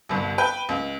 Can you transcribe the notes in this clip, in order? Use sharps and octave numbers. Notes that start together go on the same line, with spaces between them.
G1 C2
B4 G5
C#2